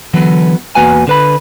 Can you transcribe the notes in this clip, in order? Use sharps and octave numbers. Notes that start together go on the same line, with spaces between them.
D3 E3 F#3 B3
E2 A#3 F#4 B4 F#5 G#5
D3 B4 B5